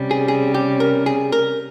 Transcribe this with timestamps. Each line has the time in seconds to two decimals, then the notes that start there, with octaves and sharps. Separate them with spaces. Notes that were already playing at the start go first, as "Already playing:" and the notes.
Already playing: C3 G3 C#4
0.11 G#4
0.28 G#4
0.54 G4
0.80 A#4
1.06 G#4
1.32 A#4